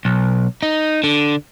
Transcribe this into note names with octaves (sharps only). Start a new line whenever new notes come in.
B1
D#4
D3